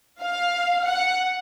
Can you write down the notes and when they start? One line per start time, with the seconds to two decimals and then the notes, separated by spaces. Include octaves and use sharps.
0.22 F5
0.86 F#5